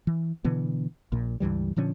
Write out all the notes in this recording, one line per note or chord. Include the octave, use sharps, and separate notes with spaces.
E3
B2 D3 E3 B3
A#1 A#2
C#2 G2 E3 G3
A#2 D3 F3 C#4